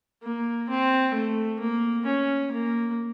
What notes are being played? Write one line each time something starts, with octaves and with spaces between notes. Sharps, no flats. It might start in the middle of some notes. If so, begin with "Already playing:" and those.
A#3
C4
A3
A#3
C#4
A#3